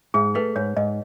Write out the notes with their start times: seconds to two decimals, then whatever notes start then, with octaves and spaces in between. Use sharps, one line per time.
0.14 G#2 G#4
0.35 A3 B4
0.56 G#2 C#5
0.77 G#2 D#5